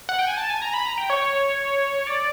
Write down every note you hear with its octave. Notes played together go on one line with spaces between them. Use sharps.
F#5
G5
G#5
A5
G#5
A#5
B5
A#5
G5
C#5
D5